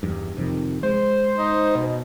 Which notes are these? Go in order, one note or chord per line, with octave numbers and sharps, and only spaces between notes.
E2 G2
F2 C3 D#3
G#3 C5
D#4
B2